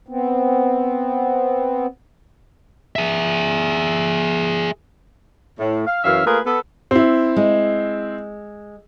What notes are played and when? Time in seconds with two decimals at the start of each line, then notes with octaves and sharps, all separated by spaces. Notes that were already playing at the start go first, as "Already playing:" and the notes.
0.08 B3 C4
2.96 G#4 E5
5.59 A2
5.87 F5
6.04 F#2 E3 C#4 E5 F5
6.26 A3 A#3 F4 G#4 A#4 B4
6.46 B3 A4
6.91 C4 E4
7.36 G#3